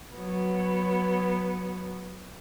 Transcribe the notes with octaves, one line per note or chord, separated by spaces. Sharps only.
F#3 B3